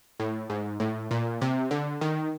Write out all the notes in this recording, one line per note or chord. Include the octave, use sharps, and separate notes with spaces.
A2
G#2
A2
A#2
C3
D3
D#3